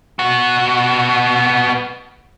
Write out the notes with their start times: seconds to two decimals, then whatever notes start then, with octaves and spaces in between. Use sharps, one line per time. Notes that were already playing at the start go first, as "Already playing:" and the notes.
0.19 B3 F#4